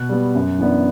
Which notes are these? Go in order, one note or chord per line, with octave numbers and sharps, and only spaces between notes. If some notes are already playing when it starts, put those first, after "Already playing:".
Already playing: B2 F#6
G3 B3
F#2
E3 B3 D4